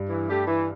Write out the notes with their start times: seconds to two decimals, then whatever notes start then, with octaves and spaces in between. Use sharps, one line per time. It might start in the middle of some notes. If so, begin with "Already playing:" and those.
Already playing: G2
0.09 E3
0.28 A3 D4 G4
0.47 E3